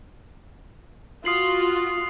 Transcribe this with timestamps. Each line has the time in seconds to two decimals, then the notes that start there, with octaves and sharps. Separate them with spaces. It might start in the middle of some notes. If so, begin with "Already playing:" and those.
1.25 F4 F#4 D#6 C7 F#7